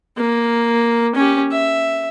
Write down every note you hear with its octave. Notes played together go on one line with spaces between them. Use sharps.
A#3
C#4 G4
E5